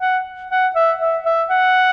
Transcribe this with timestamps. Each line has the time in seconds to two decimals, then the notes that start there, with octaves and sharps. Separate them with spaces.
0.01 F#5
0.51 F#5
0.75 E5
1.01 E5
1.26 E5
1.50 F#5